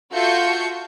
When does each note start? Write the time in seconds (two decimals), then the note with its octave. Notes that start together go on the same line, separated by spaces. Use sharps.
0.11 F4 F#4 A4 E5 G6 C#7